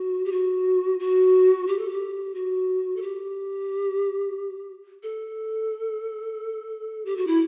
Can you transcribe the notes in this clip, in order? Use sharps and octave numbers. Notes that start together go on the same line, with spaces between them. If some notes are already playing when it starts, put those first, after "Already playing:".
Already playing: F#4
G4
F#4
F#4
G4
A4
G4
F#4
A4
G4
A4
G4
F#4
E4